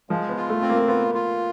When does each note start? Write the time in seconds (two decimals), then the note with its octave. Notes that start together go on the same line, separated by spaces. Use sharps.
0.10 F3 G#3
0.29 B3
0.37 F4
0.49 A3
0.62 C4
0.69 A#3
0.88 B3 F4
1.15 F4